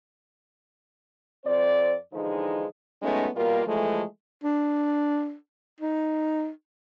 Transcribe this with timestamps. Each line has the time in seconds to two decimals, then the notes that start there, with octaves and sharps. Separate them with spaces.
1.45 F2 C4 C5 D5
2.13 D3 E3 F3 G#3 D#4
3.02 F#3 G#3 A3 B3 C#4 D#4
3.36 B2 G3 A#3 F4 A#4
3.66 E3 F3 G#3 A3
4.44 D4
5.81 D#4